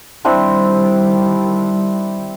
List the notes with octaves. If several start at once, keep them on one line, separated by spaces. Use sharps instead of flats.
D#3 G3 C4 D4 E4